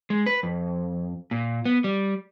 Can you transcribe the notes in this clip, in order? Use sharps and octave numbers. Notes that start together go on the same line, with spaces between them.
G#3
B4
F2
A#2
B3
G3